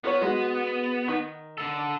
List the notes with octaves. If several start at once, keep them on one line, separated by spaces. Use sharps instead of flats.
B3 F4 A#4 C#5
G#3 F#4
D#3
D3 A4